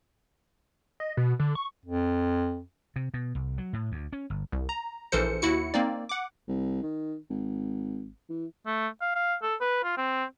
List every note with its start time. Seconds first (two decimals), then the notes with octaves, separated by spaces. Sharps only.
1.00 D#5
1.17 B2
1.40 D3
1.55 C#6
1.86 F2
2.96 C3
3.14 B2
3.35 C2
3.58 F#3
3.73 A2
3.92 D2
4.13 C#4
4.30 G1
4.52 C2
4.69 A#5
5.12 A#1 E3 A4 A#4 C5 C#7
5.42 D#2 E4 F#4 C#7
5.74 A#3 C4 D#4 D5
6.09 F#5 D6
6.48 C2
6.83 D#3
7.30 G#1
8.29 E3
8.66 A3
9.02 F5
9.15 F5
9.43 A4
9.61 B4
9.84 F4
9.98 C4